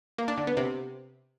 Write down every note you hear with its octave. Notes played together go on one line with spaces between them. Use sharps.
A#3
D4
D3
B3
C3